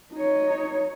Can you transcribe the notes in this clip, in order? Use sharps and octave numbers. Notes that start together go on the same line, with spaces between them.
D#4 C#5